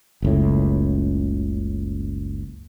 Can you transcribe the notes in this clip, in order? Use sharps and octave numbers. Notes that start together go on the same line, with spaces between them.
F#1 C#2 A2